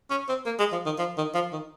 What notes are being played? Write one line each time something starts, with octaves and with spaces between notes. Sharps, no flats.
C#4
C4
A#3
G#3
F3
D#3
F3
D#3
F3
D#3